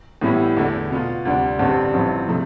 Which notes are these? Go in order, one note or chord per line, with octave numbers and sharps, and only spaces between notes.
A2 E3 G3 B3 E4
E2 D3 A3
B2 B3 F4
D2 C3 G3 D4
A1 G2 D3 G3 C4
A1 G2 F3 C4 E4
C3 F3 A3